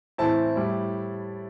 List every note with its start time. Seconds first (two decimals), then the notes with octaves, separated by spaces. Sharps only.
0.18 A2 E3 C4 E4 A5
0.56 A2 G3 E4